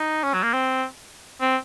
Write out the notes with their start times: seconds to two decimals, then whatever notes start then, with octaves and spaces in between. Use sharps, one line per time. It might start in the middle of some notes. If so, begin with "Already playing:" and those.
Already playing: D#4
0.24 C#4
0.34 F#3
0.43 A#3
0.53 C4
1.41 C4